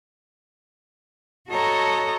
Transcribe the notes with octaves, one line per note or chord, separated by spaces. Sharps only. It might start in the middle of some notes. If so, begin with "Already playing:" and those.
F#4 A4 C#5 D#5 A5 A#5